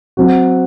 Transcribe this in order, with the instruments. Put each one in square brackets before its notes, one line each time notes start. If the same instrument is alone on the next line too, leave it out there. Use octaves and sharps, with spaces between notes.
[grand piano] F#3 C4 F#4